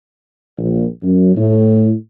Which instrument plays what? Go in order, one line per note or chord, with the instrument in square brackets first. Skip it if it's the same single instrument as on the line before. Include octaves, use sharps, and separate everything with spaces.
[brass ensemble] A#1
F#2
A2